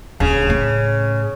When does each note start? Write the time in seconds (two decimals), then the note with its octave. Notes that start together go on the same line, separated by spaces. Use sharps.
0.20 D1 D#2 C#3
0.50 A2